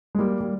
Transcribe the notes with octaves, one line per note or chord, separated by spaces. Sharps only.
G#3
G3 A#3
G3